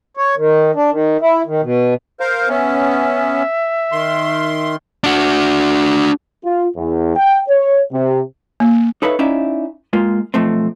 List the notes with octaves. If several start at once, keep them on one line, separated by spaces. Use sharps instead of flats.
C#5
D#3
D4
D#3
E4
D#3
B2
A#4 C5 F5
B3 C#4 E5
D#3 C6
D4 F#4
F4
E2
G5
C#5
C3
A#3
D#4 A4 B4 C#5 E5 F5
C#4 D#4 E4 D5 E5 F5
G#3 A#3 F4
B1 F3 A3 C4